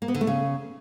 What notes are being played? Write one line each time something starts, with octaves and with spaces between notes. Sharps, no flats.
A#3
B3
D3
A3
C#3